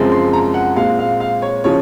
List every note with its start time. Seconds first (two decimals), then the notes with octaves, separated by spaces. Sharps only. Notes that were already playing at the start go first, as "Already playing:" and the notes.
Already playing: F#2 C#3 F3 G#3 C4
0.12 C6
0.33 A#5
0.54 F#5
0.76 A#2 G#3 C4 F5
0.99 F5
1.20 F5
1.42 C#5
1.64 C#3 F3 C#5